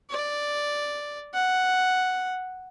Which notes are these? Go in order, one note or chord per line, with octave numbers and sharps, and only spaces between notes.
D5
F#5